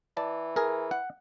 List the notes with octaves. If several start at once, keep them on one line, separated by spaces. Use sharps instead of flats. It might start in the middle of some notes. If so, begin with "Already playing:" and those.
E3 D5 A5
G#4 A#4
F#5